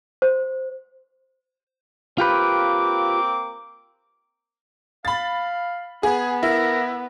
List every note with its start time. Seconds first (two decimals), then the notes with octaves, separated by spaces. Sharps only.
0.22 C5
2.18 A#3 C4 F4 G4 B4 D6
5.05 F5 B5 A6
6.03 B3 G#4
6.43 E4 A#4